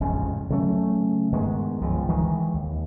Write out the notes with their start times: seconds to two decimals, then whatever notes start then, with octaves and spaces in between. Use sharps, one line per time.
0.01 A1 F2 G#2 C#3
0.50 C#3 F#3 A3 C#4
1.32 G2 D#3 G#3 B3
1.81 C#2 F3 G#3
2.09 D#3 E3 G#3
2.54 D#2